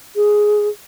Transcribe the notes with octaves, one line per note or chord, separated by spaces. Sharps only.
G#4